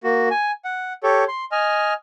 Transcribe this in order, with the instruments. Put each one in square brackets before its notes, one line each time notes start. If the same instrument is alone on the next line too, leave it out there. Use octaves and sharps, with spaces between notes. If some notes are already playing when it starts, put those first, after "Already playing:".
[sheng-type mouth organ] A#3 F#4
G#5
F#5
G4 A4 C#5
C6
D#5 G#5 F6